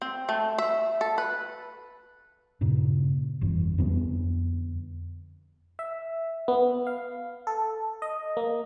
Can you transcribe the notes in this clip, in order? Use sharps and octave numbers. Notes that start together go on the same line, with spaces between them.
C4
A3
E5
A4
B4
G2 A#2 C#3
G1 F2 E3
F2 D3 G3 B3
E5
B3
F5
A4
D#5
A#3